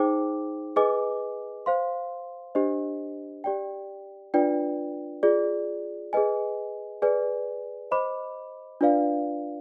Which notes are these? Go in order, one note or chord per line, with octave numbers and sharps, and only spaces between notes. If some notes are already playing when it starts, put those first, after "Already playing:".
Already playing: D#4 G#4 C5 G5 D6
G#4 B4 D#5 G#5 D6
C5 F5 C6
D4 G4 C5 D#5
G4 D5 G5
D4 F4 B4 D5 G5
F4 G#4 D5
G#4 B4 D#5 G#5
G#4 B4 D5 G#5
C5 D#5 B5 D6
D4 F4 B4 D5 F5